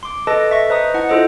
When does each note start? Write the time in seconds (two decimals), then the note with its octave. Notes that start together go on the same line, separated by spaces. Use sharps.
0.03 C6 D6
0.27 A4 B4 D#5 A5 A#6
0.51 E5 C#6
0.70 B4 C5 D#5 A#5 D#6
0.94 E4 F#5 A5
1.09 E4 F4 A4 C5 D#5